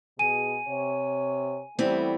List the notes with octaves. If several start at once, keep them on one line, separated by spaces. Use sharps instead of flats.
B2 G#4 G#5 D#7
C3 C#5
E3 G3 A3 B3 C4